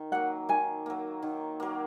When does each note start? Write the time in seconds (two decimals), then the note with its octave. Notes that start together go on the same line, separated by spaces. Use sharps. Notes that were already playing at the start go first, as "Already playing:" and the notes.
Already playing: D#3
0.12 F#3 A#3 F#5
0.49 D#3 G#5
0.86 F#3 A#3
1.22 D#3
1.60 F#3 A#3